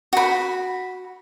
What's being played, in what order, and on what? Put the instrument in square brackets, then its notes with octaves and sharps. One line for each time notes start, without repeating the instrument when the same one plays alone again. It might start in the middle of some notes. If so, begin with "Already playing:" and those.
[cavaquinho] F#4 B5